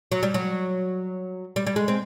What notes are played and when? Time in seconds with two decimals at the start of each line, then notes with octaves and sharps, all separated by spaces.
0.12 F#3
0.23 G3
0.34 F#3
1.56 G3
1.67 G3
1.76 G#3
1.88 C4